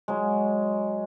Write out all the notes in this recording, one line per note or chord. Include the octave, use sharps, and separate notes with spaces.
F#3 G#3